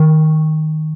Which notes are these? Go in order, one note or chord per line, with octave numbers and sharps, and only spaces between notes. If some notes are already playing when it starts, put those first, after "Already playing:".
Already playing: D#3